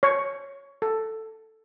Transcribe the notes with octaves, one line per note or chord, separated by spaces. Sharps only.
C#5
A4